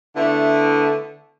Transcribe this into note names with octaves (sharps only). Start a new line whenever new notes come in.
D3 A3 B3 E4